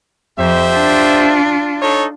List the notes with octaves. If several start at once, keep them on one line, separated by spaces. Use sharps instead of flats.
F2 G4 C5 E5
D4 F4
D#4 A4 C#5